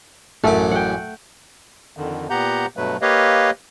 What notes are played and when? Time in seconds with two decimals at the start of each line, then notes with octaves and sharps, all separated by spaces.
0.44 A1 F#2 A3 A4 D6
0.71 F#5 G5
1.97 F2 D3 D#3
2.30 A#2 B3 G4 F#5 A#5 G6
2.77 G2 B2 F#3 A3 B4
3.02 A#3 G4 B4 C#5 D#5 F5